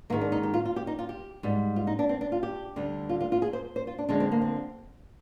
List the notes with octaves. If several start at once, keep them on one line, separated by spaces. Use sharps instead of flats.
G#2 D#3 G#3 A#3
D4
D#4
G4
F4
F4
G4
D#4
F4
G4
G#2 G3
F4
D#4
D4
C4
D4
F4
G4
D2 D3 G3
F4
F4
F4
G#4
C5
C5
F4
D4
D#2 D3 F3 G#3 D4
C4
A#3
C4